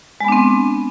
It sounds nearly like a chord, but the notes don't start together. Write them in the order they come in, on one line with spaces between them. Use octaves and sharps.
G#3 B3 D4 C4